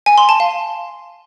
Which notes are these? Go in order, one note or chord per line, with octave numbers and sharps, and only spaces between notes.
G#5
C6
A5
F5